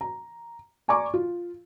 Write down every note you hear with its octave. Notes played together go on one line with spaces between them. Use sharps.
A#5
D5 G#5 A#5 C#6 D6
F4